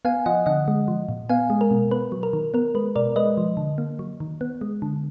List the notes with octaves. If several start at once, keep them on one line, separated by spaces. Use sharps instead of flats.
B3 F5 G#5
F3 D#5 F#5
D3 D#5 F#5
G#3
F3
A#2
B3 F5 G#5
G#3
A#4
B2
B3 B4
F#3
A#4
D#3
B3 A#4
G#3 B4
B2 A#4 D5
G#3 B4 D#5
F3
D3
A#3
F#3
D#3
B3
G#3
D3